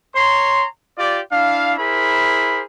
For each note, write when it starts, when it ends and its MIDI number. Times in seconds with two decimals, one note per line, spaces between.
0.16 0.66 73
0.16 0.66 82
0.16 0.66 84
0.98 1.20 65
0.98 1.20 67
0.98 1.20 74
1.32 1.74 62
1.32 1.74 64
1.32 1.74 77
1.79 2.63 64
1.79 2.63 68
1.79 2.63 70
1.79 2.63 72
1.79 2.63 83